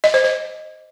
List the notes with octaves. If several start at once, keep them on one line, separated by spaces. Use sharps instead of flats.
D#5
C5
C5